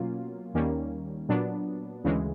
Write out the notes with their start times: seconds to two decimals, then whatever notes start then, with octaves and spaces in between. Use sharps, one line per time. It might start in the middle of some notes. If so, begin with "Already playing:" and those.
Already playing: B2 F#3 A#3 C#4 F4
0.54 D#2 D#3 G3 A#3 C#4
1.29 A#2 F#3 B3 D4
2.04 D2 C#3 E3 G#3